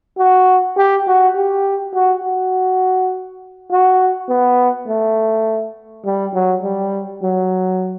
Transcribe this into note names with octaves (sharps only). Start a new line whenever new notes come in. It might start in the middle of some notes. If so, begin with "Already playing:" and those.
F#4
G4
F#4
G4
F#4
F#4
F#4
B3
A3
G3
F#3
G3
F#3